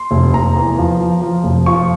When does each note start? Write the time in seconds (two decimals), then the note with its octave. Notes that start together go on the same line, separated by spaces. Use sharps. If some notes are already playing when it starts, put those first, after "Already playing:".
Already playing: C6
0.11 F1
0.33 F1 A#5
0.55 E2
0.78 F3
1.00 F3
1.22 F3
1.44 F1
1.66 F3 C#6